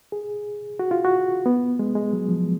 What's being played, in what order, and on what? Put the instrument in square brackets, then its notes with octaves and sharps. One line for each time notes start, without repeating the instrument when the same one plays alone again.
[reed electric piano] G#4
F#4
F4
F#4
B3
G#3
G#3
F#3
F3